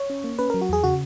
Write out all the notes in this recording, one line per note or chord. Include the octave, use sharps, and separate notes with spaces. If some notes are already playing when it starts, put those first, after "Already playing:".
Already playing: C#5
C#4
A#3
C#4 B4
F#3 A#4
F#4
E2 G#4
C#3 F#4